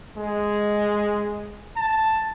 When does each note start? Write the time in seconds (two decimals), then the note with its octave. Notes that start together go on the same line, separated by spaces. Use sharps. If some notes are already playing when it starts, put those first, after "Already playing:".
0.17 G#3
1.76 A5